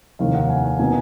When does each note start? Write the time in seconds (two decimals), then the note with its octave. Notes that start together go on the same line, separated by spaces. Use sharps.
0.19 F1 D#2 D#3 A#3 F5
0.35 F#5
0.49 G#5
0.64 F#5
0.79 B2 A#3 D#4 G#5